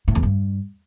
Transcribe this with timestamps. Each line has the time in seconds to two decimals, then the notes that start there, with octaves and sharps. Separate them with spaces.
0.08 A2
0.15 E2
0.23 G2